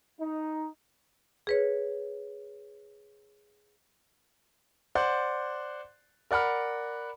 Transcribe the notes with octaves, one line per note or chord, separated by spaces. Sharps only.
D#4
G#4 B4 C#5
C5 D5 F#5
A#4 D5 F#5 B5 F6